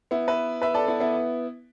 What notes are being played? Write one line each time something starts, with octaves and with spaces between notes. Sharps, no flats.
B3 E4
B4 E5
B4 E5
A4 D5
B3 E4
B3 E4